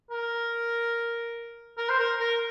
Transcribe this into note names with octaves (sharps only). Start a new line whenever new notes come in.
A#4
A#4
C5
A#4
A#4